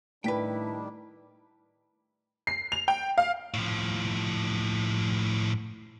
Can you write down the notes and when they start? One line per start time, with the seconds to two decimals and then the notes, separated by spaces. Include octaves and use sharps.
0.24 A2 D#3 G3 D4 E4 B4 G5 B6
2.47 C7
2.72 F7
2.88 G5
3.18 F5
3.54 A2 F3